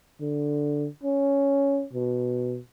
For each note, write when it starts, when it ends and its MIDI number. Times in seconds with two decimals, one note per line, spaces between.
0.21 0.87 50
1.03 1.85 61
1.93 2.59 47